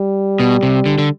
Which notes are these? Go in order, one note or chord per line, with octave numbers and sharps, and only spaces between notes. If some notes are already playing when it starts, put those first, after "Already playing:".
Already playing: G3
B2
C3
D3
D3